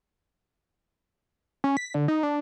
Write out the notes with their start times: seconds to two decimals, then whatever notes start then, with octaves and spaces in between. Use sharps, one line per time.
1.64 C#4
1.77 B6
1.94 D3
2.08 D#4
2.23 D4